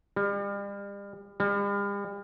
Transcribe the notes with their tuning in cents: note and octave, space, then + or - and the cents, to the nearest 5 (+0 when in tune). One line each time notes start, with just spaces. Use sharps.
G3 +40
G3 +45